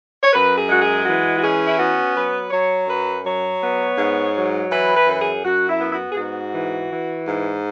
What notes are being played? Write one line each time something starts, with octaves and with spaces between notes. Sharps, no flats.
C#5
F#2 B4
G#4
G#3 F#4
G#4
E3 F#4
F#4
C#4 G#4
E4
B3 F#4
F#3 B4
F#3 C#5
F#2 B4
F#3 C#5
B3
G#2
F#3
E3 B4
B4
F#2 B4
G#4
F#2 F#4
E4
B3
E4
F#4
G#4
G#2 F#4
E3
E3
G#2